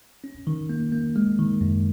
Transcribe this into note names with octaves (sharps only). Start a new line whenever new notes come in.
C#4
D#3
A#3
A#3
G#3
D#3
F#2